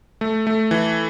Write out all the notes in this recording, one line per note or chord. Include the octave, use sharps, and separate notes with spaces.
A3
A3
E3